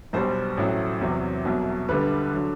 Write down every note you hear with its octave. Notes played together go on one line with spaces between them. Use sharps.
B1 B2 G3 C5
A1 A2 F#3
E2 C3 F#3
C2 B2 F#3
D2 D3 G3 B4
D3 F#3